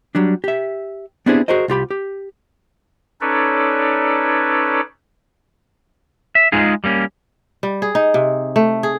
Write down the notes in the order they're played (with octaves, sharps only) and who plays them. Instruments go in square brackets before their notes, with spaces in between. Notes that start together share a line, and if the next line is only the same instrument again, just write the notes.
[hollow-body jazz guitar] F#3 G3 D4
G4 E5
B3 C4 D4 E4 G4 G#4
F#4 G#4 A#4 C5 D#5
C2 F4 G4 B5
G4
[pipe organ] C#4 D#4 A4 B4 C#5 D5
[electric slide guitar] E5
G#3 D#4 F4 G#4
G3 A#3 C#4
[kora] G3
G#4
D#4
C3
A3
G#4